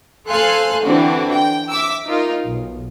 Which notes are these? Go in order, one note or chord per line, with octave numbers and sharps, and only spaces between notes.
A4 C5 F5 G#5 C6 F#6
D3 E3 C4 D4 F#4
G5
E5 D6 E6
D#4 F4 A#4
B1